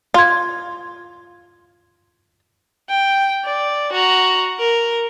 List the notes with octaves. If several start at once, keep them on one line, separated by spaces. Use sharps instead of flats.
F4 C6 G#6
G5
D5
F#4 A#5
A#4